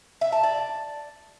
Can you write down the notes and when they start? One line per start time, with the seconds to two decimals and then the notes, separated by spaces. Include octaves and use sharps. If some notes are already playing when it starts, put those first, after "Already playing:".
0.21 E5
0.32 A5
0.43 D5